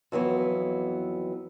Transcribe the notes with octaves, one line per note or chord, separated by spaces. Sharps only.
F2 E3 F#3 B3